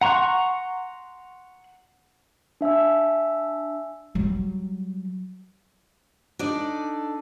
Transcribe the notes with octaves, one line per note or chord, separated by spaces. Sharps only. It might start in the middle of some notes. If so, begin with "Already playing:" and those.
F#5 A#5 C6 C#6 F#6
D4 E5 G#5 E6
F#3 G3
D4 D#4 A4 D5